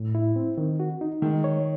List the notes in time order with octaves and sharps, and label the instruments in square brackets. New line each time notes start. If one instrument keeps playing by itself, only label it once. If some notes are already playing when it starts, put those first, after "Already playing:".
Already playing: [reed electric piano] A2
E4
C4
D#3
F#4
D#4
[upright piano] D#3 [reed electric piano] G#3
[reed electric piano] C#5